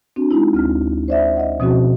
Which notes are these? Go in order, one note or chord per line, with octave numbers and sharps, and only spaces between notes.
C4 D4 F#4
G#3 D#4 E4
D2 C4 F6
C5 D5 E5
D#5 F#5
B2 F3 C4 C#4 F#4